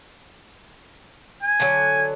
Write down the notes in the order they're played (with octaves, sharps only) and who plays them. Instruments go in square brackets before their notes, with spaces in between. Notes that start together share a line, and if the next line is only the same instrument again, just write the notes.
[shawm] G#5
[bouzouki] D3 F#3